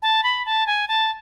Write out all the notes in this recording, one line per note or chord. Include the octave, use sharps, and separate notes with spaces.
A5
B5
A5
G#5
A5